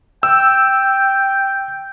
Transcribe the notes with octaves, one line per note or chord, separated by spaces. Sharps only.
G5 E6